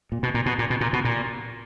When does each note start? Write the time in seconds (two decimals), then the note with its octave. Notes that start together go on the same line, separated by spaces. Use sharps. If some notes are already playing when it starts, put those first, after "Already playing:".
0.12 A#2
0.23 B2
0.34 A#2
0.46 B2
0.59 A#2
0.70 B2
0.81 A#2
0.93 B2
1.05 A#2